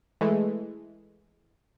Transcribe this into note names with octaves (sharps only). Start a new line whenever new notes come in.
E3 G#3 A3